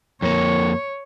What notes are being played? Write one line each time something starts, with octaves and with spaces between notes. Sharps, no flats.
F2 A#3 C#5